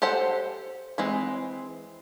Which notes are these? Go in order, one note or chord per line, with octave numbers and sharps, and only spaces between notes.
G4 A4 C5 F#5
E3 G#3 C4